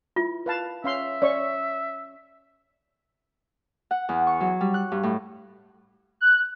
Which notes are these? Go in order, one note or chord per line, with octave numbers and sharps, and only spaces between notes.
E4 F4
B4 F5 A5
C#4 E5 F5 C6
C#4 C#5 D5 C#6
F#5
E2
C#6
F#3
G3
F#6
G2
A2
F#6